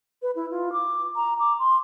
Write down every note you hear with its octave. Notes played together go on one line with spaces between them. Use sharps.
B4
E4
F4
D6
A#5
D6
C6